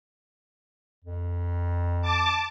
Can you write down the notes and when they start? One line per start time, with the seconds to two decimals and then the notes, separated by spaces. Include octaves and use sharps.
1.04 F2
2.02 A5 D6